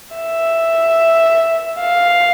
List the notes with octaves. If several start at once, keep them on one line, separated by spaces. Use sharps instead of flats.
E5
F5